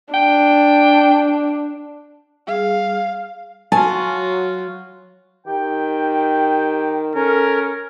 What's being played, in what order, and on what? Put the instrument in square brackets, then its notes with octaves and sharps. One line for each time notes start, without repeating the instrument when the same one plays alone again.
[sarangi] D4 [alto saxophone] G5
[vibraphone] G3 G#4 [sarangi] F5
[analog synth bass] F#3 [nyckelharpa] F4 F#4 [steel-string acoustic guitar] G#5 [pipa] A5
[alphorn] D#3 [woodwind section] G4 G5
[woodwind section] C#4 [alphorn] A4 [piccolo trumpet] A#4